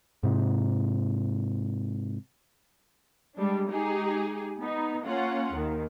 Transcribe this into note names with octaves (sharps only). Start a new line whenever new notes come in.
G#2 C3
G3 G#3 D4
G#3 D#4 G4 G#4
B3 D#4
A#3 C#4 F4 F#5
D#2 D#3